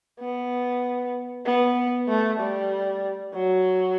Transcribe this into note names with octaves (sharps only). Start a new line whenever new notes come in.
B3
B3
A3
G3
F#3